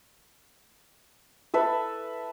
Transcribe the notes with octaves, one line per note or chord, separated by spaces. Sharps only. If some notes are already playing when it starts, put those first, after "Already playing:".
A4 B4 E5